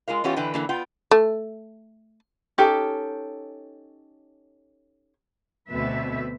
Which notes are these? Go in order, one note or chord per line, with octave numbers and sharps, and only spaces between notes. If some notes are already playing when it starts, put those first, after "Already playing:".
G#3 F4 A#4 F5
E3 B3 C#4 F4 G4 C#5
D3 E3 B4 G5
D3 E3 A#3
B3 F4 G5
A3
C#4 D#4 G4 A4
D2 B2 C4 B4 E5